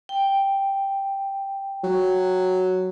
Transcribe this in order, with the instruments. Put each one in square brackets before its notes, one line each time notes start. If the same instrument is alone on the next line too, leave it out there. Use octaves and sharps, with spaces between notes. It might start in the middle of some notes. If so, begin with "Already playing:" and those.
[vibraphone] G5
[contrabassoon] F#3